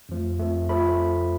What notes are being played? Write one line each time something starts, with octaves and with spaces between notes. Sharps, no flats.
F2 F3 A3
F2 F3 A3
F3 A3 B5